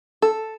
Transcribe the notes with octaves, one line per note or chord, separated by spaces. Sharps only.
A4